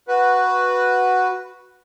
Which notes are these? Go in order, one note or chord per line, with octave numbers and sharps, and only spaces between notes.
F#4 B4